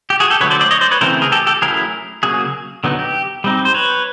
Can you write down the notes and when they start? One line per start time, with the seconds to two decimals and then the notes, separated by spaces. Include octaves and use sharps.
0.10 G4
0.20 F#4 G#4
0.30 G4 A4
0.41 D3 F#3 A3 B4 C#5
0.50 C5 D5
0.61 C5 D5
0.71 C#5 D#5
0.81 C5 D5
0.91 B4 C#5
1.01 C#3 E3 A3 C4 A#4 C5
1.22 G#4 A#4
1.32 G4 A4
1.47 G4 A4
1.62 F#3 A3 C#4 E4 G#4 A#4
2.23 C#3 F#3 A#3 F#4 G#4
2.84 D3 F#3 B3 D#4
2.99 G4
3.44 G3 C4 D#4
3.65 C5
3.74 B4 C#5